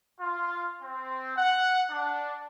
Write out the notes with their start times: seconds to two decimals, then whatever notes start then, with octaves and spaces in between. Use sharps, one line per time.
0.20 F4
0.82 C4
1.37 F#5
1.90 D4